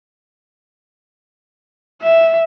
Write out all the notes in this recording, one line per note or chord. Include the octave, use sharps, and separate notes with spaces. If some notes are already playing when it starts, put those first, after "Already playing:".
E5